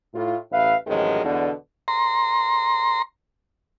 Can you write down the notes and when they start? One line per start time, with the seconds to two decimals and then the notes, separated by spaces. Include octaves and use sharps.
0.14 A2 F4
0.51 A1 B4 E5 F5
0.87 A1 F2 D#3 F#3 G#3
1.24 E2 B2 D3
1.88 A#5 C6